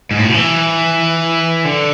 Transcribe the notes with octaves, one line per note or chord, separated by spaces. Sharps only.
G#2
A2
B2
E3
D3